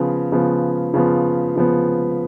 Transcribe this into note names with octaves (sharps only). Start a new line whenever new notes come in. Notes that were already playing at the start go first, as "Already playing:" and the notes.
Already playing: C#3 F3 B3
C#3 F3 B3
C#3 F3 B3
C#3 F3 B3